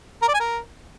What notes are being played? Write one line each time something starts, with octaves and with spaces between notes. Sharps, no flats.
A#4
D5
G#5
A#4